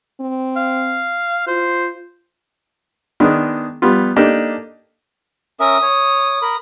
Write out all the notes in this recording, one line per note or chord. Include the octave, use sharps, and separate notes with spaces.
C4
F5
F4 C5
D#3 G#3 B3 D4
G3 B3 F4
A#3 D4 D#4 G4 A4
C#4 A#4 E5 D#6
C#5
A#4 B5